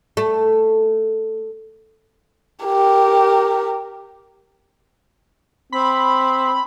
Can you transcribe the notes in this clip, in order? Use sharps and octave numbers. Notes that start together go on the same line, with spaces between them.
A3
G4 A#4
C4 B5